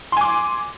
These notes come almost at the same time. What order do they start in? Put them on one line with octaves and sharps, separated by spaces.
C6 G#5 D6